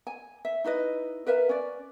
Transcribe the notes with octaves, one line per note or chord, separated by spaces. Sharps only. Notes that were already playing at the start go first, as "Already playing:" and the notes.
G#5
E5
D#4 E4 B4 D#5
A#4 B4 E5 F5
C#4 D5